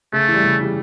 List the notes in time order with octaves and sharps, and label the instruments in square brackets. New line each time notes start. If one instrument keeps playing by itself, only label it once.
[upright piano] C#3 [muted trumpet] A3
[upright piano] E3
G3
C#3
E3 G3